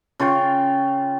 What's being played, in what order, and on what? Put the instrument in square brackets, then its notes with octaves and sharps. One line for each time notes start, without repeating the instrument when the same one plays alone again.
[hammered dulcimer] C#3 F4 G5 C#6